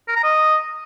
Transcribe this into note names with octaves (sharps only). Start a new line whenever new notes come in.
A#4
A#5
D#5